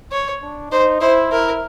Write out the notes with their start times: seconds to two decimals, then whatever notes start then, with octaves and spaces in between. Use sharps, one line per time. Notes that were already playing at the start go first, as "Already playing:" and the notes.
0.12 C#5
0.42 D4
0.71 D#4 C5
1.01 E4 C5
1.32 E4 A#4